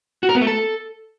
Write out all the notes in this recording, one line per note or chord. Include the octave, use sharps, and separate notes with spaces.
F#4
A#4
B3
A3
A4